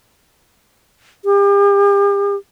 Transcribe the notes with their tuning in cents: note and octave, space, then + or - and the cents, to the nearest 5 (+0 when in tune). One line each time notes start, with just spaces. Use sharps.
G4 +40